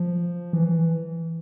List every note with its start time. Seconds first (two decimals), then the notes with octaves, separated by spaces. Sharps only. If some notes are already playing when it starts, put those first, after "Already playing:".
Already playing: F3
0.53 E3